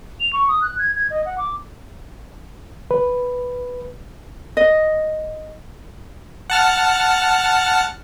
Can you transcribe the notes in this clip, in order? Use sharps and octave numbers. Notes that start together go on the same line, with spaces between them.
F7
C#6
D#6
F#6
G#6
G#6
D#5
F#5
D6
B4
D#5
F#5 A5 F6